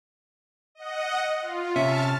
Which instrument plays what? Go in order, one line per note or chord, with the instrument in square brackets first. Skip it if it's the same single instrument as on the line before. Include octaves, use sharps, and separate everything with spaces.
[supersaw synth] D#5 F#5
F4
[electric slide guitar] C3 C#4 [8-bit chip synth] E5 [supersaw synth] A5 F6 A6